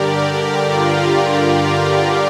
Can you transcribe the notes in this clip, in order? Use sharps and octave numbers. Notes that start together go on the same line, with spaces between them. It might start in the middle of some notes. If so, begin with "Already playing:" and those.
Already playing: G2 D3 G4 A#4 D5
F4